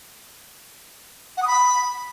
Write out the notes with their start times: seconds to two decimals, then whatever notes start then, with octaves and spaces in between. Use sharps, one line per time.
1.37 F#5
1.42 D#6
1.47 B5